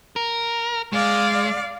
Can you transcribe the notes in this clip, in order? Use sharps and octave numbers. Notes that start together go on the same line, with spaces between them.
A#4
G#3 D5 F5